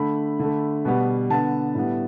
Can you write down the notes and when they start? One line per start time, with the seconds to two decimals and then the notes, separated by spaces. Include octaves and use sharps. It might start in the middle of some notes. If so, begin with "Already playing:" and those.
Already playing: D3 A3 B5
0.39 D3 A3
0.85 B2 G3 B3
1.30 D3 B3 A5
1.75 A2 G3 B3